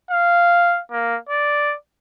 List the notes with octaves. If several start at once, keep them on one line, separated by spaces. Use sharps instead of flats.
F5
A#3
D5